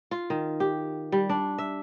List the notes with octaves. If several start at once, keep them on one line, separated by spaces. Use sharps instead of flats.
F4
D#3
G4
G3
D4
E5